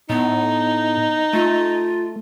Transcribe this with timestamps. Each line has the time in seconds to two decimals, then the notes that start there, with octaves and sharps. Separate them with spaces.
0.10 A2 B3 D#4
1.33 A3 F4